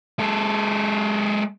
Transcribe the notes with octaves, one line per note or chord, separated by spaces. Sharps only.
G#3 A4